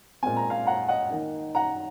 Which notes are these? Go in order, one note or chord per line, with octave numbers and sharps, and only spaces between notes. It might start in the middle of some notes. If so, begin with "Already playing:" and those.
A#2 G#3 C4 G#5
A#5
F5 G#5
F#5 A#5
D#5 F#5
D#3 A#3 D#4
F#5 A#5